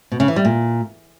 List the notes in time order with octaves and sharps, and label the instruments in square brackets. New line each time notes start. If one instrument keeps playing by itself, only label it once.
[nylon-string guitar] B2
C#3
E3
G3
A#2